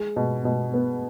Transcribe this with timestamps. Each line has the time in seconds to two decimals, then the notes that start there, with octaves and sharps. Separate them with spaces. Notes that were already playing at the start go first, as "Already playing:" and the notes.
Already playing: G#3
0.16 B2
0.45 B2
0.74 B3